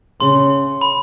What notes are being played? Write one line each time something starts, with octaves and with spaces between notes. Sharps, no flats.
C#3 C6
B5